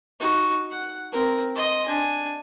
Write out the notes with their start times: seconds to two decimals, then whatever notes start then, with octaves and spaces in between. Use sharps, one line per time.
0.20 D#4 F#4
0.71 F#5
1.12 C4 A#4
1.55 D#5 C6
1.85 D4 G#5